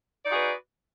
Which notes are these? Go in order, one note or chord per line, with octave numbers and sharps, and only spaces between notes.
D#4 F#4 G#4 B4 D5